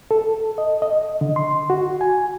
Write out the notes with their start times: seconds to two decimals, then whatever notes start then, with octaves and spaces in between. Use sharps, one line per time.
0.11 A4
0.58 D#5
0.82 D#5
1.21 D3
1.36 C6
1.70 F#4
2.01 G#5